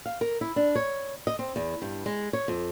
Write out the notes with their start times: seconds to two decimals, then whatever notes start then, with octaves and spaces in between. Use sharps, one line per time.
0.06 F5
0.21 A#4
0.41 E4
0.56 D4
0.76 C#5
1.27 D#5
1.39 C4
1.56 E2
1.82 G2
2.06 G#3
2.33 C#5
2.48 F2